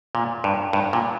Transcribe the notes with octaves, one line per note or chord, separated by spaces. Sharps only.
A#2
G2
G2
A#2